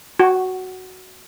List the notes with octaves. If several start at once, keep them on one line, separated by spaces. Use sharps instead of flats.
F#4